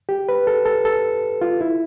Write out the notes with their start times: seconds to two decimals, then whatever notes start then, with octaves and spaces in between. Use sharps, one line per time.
0.09 G4
0.29 B4
0.47 A4
0.66 A4
0.85 A4
1.41 F4
1.61 E4